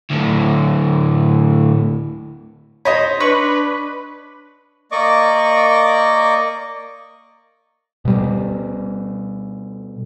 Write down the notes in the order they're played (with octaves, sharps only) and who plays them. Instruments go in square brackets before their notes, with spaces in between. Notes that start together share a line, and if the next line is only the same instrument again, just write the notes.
[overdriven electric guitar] D2 A2
[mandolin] C5 B5 [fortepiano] C#5 D#5
[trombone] D4 [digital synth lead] B4 [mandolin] C#6
[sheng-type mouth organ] A#3 D5 D#5 C#6 D6
[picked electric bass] B2 G3